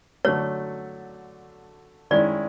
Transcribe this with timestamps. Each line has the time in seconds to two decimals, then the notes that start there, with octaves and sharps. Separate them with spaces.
0.25 D3 F#3 A3 C#5
2.11 D#3 G#3 C#4 E4 D5